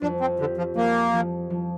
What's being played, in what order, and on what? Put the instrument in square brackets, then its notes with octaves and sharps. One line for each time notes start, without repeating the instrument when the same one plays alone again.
[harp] F2 [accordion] D4
[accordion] C4
[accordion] D3 [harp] G4
[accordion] F3
[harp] F2 [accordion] A#3
[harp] F3
F3